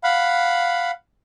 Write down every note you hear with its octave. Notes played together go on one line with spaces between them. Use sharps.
F5 F#5 B5